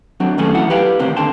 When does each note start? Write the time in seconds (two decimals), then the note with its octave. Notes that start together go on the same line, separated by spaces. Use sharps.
0.20 F#3 C4 D4
0.38 D#3 A3 C#4 G#4 A4
0.55 E3 F#3 E4 F#5
0.70 G4 B4 F5 G5
0.99 E2 A2 C3 D#3 C4
1.16 D#2 D3 G5 A5 C6